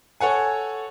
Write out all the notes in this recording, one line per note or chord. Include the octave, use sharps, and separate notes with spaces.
A4 C#5 F#5 G#5